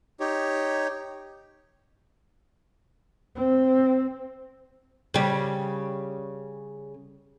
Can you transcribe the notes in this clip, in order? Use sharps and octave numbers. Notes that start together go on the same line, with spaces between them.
D#4 G4 C#5
C4
C#3 G3